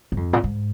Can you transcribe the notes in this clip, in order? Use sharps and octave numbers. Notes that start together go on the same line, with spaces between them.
G#2
F2
A#2
G#2